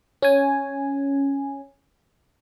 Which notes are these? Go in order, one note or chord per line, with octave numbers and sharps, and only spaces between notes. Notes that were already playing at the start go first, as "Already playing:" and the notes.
C#4 G#5